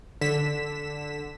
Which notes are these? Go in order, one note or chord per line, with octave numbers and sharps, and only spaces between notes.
D3 B6 E7